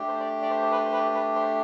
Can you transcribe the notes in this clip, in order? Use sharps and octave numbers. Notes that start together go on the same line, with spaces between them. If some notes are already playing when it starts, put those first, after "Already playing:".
Already playing: A3 D4 G4
C5
D5
D5
C5
C5
B4
C5
B4
B4
C5